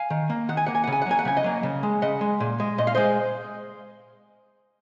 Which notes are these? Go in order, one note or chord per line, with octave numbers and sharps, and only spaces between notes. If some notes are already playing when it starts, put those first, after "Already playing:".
Already playing: F5 G#5
D#3
A#3
D#3 F#5
G#5
A#3 F#5
G#5
F#5
C#3
G#5
F#5
F#3 A#3 G#5
F#5
C#3 G#5
D#5 F#5
F#3 A#3
C#3
G#3
C#3 D#5 F#5
G#3
A#2
G#3
A#2 D#5
F5
G#3 C5 D#5